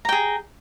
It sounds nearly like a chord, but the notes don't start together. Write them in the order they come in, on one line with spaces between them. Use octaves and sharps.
A#5 G5 G#4